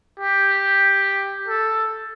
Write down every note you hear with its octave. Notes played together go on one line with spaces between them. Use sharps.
G4
A4